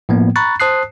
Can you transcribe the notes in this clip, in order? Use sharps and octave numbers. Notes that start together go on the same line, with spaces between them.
A2 F3 A#3 B3
A#5 B5 C#6 F#6 A6
C5 A5 D#6 F#6 C7